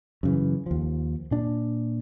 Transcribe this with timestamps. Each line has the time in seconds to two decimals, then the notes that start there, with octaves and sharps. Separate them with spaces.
0.23 F#2 C#3 E3
0.66 D#2 F3
1.31 A#2 D4